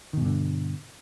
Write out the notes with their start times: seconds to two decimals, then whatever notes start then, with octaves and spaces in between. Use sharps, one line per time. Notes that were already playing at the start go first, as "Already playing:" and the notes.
0.13 D#3
0.17 B2
0.21 G2
0.25 D3